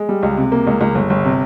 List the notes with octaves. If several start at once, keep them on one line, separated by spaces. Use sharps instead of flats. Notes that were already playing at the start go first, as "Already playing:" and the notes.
Already playing: G#3
G3
C#2
C3
A#3
C#2
C#2
G1
G1
C3